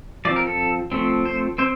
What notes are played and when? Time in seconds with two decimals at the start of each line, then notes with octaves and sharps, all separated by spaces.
0.25 F3 D5
0.28 C4
0.36 A#4
0.47 A4
0.92 F3 A3 C4
1.25 C5
1.58 C4 C5